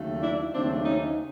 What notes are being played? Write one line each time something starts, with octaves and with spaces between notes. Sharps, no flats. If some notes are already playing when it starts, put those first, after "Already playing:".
Already playing: D#2 C#3 F#3 A3
D4 E4
D#2 C#3 F#3 A3 C4 D4
C#4 D#4